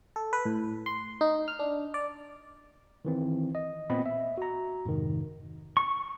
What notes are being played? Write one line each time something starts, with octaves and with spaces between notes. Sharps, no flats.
A4
B4
A2
C6
D#4
F6
D4
D5
D#3 E3 C4
D#5
A#2 B3 C4 D#5 B5
E5
F#4 A#5
F2 G#2 C3 D#3
C#6